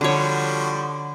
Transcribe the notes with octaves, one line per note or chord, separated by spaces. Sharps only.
D3 F3 G3 F#4 C#5